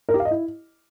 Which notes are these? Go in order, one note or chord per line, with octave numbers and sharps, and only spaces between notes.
A#4
G4
F5
D#5
E4